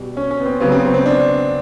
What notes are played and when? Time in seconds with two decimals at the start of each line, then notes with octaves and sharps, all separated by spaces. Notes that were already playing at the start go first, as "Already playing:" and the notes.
Already playing: B2 G3
0.17 C#4
0.31 C#4
0.40 B3
0.46 C4
0.60 C#3 F#3 B3
0.72 C4
0.84 B3
0.94 C4
1.06 D4